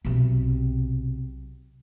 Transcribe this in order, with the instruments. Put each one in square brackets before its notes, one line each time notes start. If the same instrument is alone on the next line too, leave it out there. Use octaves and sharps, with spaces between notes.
[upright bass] B1 C3